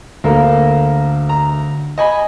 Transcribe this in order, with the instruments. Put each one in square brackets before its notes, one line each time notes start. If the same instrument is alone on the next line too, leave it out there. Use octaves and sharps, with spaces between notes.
[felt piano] D2 F5 [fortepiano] A#3 A4 A#4
[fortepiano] A#5
D#5 G#5 B5